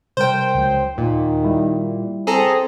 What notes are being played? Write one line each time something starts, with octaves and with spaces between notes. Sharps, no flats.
C3 G3 A#4 C5 G5
C#2 F#3
D#2 A#2 D#3
G3 E4 G4
C4 G#4 A4 A#5